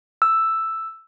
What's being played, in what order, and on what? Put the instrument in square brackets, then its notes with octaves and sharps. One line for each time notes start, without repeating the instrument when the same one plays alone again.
[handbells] E6